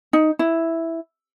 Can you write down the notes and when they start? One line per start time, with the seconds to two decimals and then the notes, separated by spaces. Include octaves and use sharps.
0.13 D#4
0.39 E4